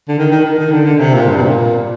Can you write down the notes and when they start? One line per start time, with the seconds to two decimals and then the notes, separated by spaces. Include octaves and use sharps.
0.08 D3
0.18 D#3
0.31 D#3
0.45 D#3
0.59 D#3
0.72 D3
0.86 D3
1.00 C3
1.14 A#2
1.28 G2
1.38 C3
1.42 A#2